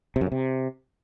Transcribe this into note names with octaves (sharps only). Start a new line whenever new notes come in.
C3
F#2
C#3
C3